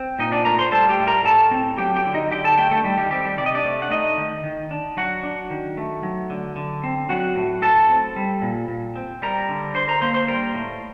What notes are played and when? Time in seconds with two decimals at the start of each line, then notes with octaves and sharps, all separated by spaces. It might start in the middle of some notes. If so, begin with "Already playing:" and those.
Already playing: C4
0.19 A#2 D#4 D#5
0.32 D4 D5
0.45 A3 A#4 A#5
0.59 C5 C6
0.71 G3 A4 A5
0.89 G4 G5
0.99 A2
1.07 A#4 A#5
1.25 A2 A4 A5
1.51 C4
1.78 F#3 G4 G5
1.96 G4 G5
2.05 D3
2.14 D#4 D#5
2.31 D3 G4 G5
2.44 A4 A5
2.58 A3 G4 G5
2.71 A3 A4
2.84 D#3 G3 G4
2.98 G3 G4
3.11 G3 C4 G4
3.24 G3 G4
3.38 C3 D5
3.46 D#5
3.54 D4 D5
3.65 A3
3.82 F#5
3.91 A3 D#4 D#5
4.18 D#3
4.44 D#3
4.71 D4
4.97 F#3 F#4 F#5
5.23 D4
5.50 D#3
5.77 A3
6.03 F#3
6.30 D3
6.56 D3
6.84 C4
7.09 F#3 F#4 F#5
7.36 A2
7.62 A2 A4 A5
7.90 C4
8.16 G3
8.42 A#2
8.68 A#2
8.96 C4
9.22 G3 A#4 A#5
9.49 D3
9.75 D3 C5 C6
9.88 A#4 A#5
10.01 A#3 C5 C6
10.14 C5 C6
10.28 G3 A#4 A#5
10.54 A2